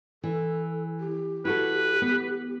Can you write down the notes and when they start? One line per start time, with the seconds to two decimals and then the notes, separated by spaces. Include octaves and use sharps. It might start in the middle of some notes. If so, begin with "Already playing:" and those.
0.24 E3 A4
1.00 G4
1.45 E4 F#4 A4 B4
2.02 B3